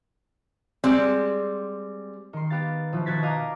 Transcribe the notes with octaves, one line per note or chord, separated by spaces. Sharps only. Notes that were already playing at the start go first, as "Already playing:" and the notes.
G3 G#3 C4
D#3 C6
B3 G4 F5 A6
B2 F3 E4
B2 D#3 F#4 G#6 A6 B6
D#5 F5 A#5 D6